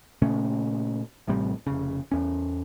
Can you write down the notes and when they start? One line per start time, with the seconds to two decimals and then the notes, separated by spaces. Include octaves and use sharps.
0.22 A#2 C#3 A3 C#4
1.27 A1 A2 C3 G3
1.67 F1 C#3
2.12 E2 C#4